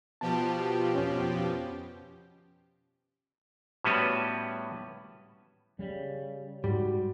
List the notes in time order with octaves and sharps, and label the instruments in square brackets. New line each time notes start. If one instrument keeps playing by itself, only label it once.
[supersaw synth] B2 F3 G4 [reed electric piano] A5
[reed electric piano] F2 C#4
[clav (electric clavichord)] A2 G3 B3 C#4 F#4 B4
[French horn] C#3 [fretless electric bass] G3
[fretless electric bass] G#2 [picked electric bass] G3 [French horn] F#4